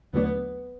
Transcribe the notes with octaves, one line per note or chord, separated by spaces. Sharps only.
D#2 D3 F#3 A3 B3 D4